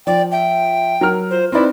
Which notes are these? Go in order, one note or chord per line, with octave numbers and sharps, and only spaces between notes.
F3 D5 G5
E5 G5
F#3 A#4 F6
F4 C5
C4 D#4 E4 B4 D5